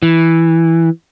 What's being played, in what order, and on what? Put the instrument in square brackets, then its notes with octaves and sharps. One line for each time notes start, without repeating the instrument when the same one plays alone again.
[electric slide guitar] E3